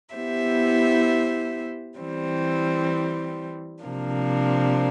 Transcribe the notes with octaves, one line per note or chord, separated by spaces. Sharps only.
B3 E4 G4 C5 E5
E3 G3 C4
C3 F3 A#3 D4